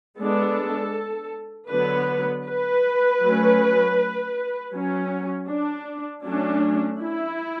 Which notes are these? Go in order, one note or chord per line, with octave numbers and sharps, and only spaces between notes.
G#3 B3 D4 A4
D3 F#3 B3 B4
B4
F#3 A3 C#4
F#3 C#4
D4
F#3 A3 C#4 D4
E4